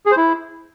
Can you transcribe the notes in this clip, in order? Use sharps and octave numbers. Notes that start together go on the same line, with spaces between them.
G#4
C5
E4